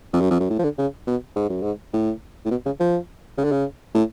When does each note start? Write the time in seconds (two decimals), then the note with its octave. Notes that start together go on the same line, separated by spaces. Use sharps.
0.13 F2
0.21 F#2
0.30 F2
0.40 F#2
0.50 A2
0.59 F3
0.64 D3
0.78 C#3
1.07 B2
1.36 G#2
1.49 F#2
1.62 G#2
1.93 A2
2.45 A2
2.51 B2
2.66 C#3
2.80 F3
3.37 C#3
3.44 D3
3.52 C#3
3.94 A2